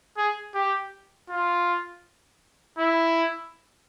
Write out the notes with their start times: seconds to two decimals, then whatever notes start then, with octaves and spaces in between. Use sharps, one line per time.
0.17 G#4
0.54 G4
1.30 F4
2.78 E4